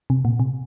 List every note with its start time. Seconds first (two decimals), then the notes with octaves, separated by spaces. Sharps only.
0.10 C3
0.25 A#2
0.40 C3